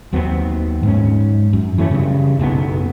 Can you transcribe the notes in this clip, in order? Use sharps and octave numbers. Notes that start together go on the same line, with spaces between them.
D#2 F#3 B3 C4
G#2 C#4
F#2
E3 F#3 A3 C#4
G2 C#3
F#1 B1 A2 B3